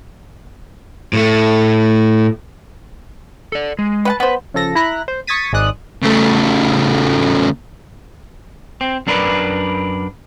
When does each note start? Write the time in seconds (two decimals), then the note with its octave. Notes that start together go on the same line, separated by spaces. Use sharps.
1.13 A2 A3
3.52 A4 D5
3.79 G#3
4.05 B4 F#5 A5
4.20 B3 B4 C5
4.54 C#3 F3 A4 A#6
4.75 E4 A#5 B5 F#6 A#6
5.08 C5
5.27 C#6 D#6 G#6 A6 B6 D#7
5.52 G#1 G#2 G#3 D5 D#6 F#6
6.03 C#3 A3
8.81 C4
9.07 F#2 D4 A#4 B4 D5 B5